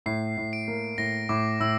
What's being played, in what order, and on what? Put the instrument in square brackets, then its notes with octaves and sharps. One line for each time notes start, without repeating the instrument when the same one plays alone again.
[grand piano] A2 [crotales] C7
[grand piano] A2
[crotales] D7
[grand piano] A#3
[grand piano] A2 [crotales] A#6
[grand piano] A2 [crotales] D6
[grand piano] A2 [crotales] E6